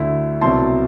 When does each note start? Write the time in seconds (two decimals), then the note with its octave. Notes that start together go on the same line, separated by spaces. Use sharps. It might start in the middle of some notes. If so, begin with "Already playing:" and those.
Already playing: D2 D3 A3 E4
0.41 C2 B2 F#3 C4 E4 A5 C6